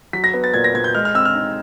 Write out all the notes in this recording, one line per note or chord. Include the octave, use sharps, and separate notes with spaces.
F#3 B6
A#6
B3
A6
A#2 G#6
A#6
A#2 G#6
G6
G#3 F6
F6
C4 E6
F6
D#4